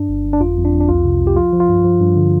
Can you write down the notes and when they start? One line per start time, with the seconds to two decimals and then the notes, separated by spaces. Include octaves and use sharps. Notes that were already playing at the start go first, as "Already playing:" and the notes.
Already playing: G2 D4
0.09 G1
0.24 G1
0.33 D4
0.40 F2 F4
0.57 F2
0.65 D4
0.73 F2
0.80 D4
0.89 C2 F4
1.05 C3
1.20 C2
1.27 G4
1.36 F3 F4
1.53 F3
1.60 F4
1.69 G2
1.84 F3
2.01 G2
2.16 D3